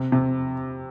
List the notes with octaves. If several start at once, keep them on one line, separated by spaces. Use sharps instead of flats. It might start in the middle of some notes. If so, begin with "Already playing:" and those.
Already playing: C3
C3